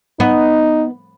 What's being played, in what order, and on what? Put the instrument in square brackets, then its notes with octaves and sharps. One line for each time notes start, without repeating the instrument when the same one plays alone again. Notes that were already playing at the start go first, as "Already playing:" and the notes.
[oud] B3 [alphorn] D#4